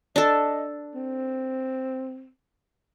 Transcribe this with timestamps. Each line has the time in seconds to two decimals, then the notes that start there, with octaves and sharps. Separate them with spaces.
0.16 D4 A4 D#5
0.95 C4